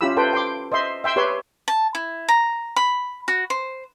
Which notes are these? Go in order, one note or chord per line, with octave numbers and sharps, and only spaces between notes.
C#4 E4 F4 G4 B5 E6
A4 B4 C5 G5
G5 C6 D6
C5 D#5 E5 C6
E5 G5 C6 E6
G4 B4 C#5 C6
A5
E4
A#5
B5
F#4
C5